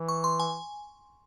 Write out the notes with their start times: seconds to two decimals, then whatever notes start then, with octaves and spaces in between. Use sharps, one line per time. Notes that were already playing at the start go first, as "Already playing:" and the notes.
Already playing: E3
0.08 C#6
0.24 C6
0.40 G#5